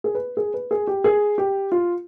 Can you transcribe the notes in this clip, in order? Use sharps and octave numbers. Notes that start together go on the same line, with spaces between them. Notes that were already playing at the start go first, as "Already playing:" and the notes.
G#4
B4
G#4
B4
G#4
G4
G#4
G4
F4